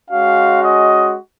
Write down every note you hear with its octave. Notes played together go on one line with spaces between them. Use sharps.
G#3 C#4 F#4 F5
D#5